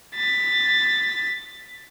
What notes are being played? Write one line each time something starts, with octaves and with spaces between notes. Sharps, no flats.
A6 B6